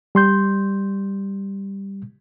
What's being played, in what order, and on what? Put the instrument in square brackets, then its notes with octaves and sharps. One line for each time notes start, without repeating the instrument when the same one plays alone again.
[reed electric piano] G3 C6 G6